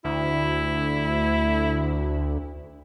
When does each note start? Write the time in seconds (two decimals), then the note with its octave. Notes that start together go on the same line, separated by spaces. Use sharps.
0.05 D2 E4